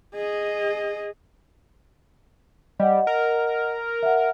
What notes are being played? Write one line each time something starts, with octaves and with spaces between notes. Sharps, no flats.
G#4 D#5
G3 D#5 F#5
A#4
E5 F#5